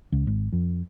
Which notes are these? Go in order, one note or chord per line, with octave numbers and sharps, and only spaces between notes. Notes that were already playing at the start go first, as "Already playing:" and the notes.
C#2
G#1
F2